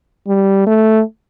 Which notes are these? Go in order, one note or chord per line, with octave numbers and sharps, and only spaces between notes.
G3
A3